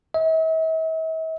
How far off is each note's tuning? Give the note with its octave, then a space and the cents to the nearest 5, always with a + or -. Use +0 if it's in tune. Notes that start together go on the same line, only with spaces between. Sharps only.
E5 -45